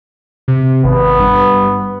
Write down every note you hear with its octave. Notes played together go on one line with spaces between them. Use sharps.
C3
G#1 B3
G2